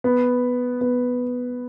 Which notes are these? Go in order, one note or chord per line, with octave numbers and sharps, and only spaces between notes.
B3
B3